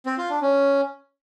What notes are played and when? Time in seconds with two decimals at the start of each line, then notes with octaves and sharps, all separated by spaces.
0.06 C4
0.18 F4
0.30 D4
0.42 C#4